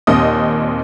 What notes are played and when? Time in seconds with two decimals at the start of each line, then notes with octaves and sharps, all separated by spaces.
0.07 D#2 A#2 C4 D#5 D#6